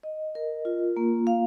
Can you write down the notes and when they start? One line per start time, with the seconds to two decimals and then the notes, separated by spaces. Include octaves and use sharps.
0.03 D#5
0.35 A#4
0.65 F4
0.97 A#3
1.27 F5